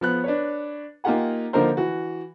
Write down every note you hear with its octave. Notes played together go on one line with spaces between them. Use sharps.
F3 B3 F#6
D4 B4 C#5
A#3 D#4 F4 G4 F#5 G#5
D3 F3 A#3 D#4 A#4 C5
E3 F#4